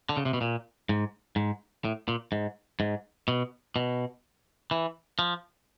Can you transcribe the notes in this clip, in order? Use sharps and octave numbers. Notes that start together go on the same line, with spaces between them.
D3
C#3
C3
B2
A#2
G#2
G#2
A2
A#2
G#2
G#2
B2
B2
E3
F3